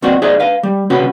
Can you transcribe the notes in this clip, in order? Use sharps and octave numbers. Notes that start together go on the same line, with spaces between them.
B1 B2 C4 F#4 D5
D#4 G#4 C5 D5 E5
B4 F5
G3
C2 C#3 C#4 F#4 B4